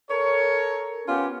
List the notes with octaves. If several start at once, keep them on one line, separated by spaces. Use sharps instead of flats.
A4 A#4 C#5
B3 C#4 F4 G4